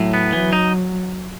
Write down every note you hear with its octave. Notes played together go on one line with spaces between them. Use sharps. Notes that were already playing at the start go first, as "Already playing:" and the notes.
Already playing: A2 F#3
B3
E3 F#3
D#4